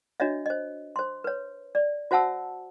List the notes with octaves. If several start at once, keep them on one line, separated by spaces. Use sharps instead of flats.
D4 F#4 C#5 D#5 E5
C5 D#5
C5 C6
B4 C#5
D5
F#4 C5 E5 F#5 A5 E6